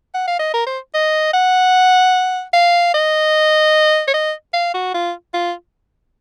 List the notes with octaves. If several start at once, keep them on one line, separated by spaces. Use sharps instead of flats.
F#5
F5
D#5
A#4
C5
D#5
F#5
F5
D#5
C#5
D#5
F5
F#4
F4
F4